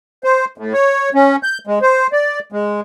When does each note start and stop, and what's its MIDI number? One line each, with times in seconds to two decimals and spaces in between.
0.24 0.45 72
0.58 0.73 45
0.73 1.09 73
1.15 1.36 61
1.43 1.58 91
1.67 1.79 56
1.82 2.07 72
2.13 2.39 74
2.52 2.81 56